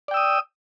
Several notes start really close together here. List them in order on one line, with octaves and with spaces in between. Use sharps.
D5 G5 E6 D#6